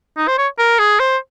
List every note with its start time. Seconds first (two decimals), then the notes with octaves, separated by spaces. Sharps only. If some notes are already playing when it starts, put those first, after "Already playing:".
0.17 D#4
0.28 C5
0.38 C#5
0.59 A#4
0.79 G#4
1.00 C5